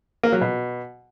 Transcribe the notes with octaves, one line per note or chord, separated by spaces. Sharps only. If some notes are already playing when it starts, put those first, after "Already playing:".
A#3
F#3
B2